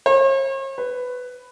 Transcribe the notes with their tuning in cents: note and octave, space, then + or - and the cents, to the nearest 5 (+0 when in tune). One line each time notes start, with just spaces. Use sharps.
C#5 -45
B4 +10